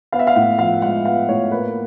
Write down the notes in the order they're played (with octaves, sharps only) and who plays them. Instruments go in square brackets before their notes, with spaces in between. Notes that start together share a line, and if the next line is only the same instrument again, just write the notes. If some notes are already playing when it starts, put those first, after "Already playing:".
[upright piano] B3 F5
E5
F5
A2 F#5
F3 F5
G#3 F#5
B3 F5
A2 C#5
A#3 B4